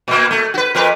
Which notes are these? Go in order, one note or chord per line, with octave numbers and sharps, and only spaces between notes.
A#2 A#3
A3
F#4 B4
F2 A#4 B4